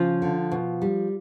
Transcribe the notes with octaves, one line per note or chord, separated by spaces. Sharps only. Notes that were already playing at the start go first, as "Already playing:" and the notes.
Already playing: C#3 F3 F4
D3
B2
G3